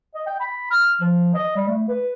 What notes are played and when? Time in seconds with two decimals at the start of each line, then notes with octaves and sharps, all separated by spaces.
0.15 D#5
0.26 G5
0.40 B5
0.71 F6
1.01 F3
1.35 D#5
1.56 G3
1.68 A3
1.89 B4